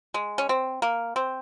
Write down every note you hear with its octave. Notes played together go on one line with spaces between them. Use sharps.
G#3
C#4
C4
A#3
C4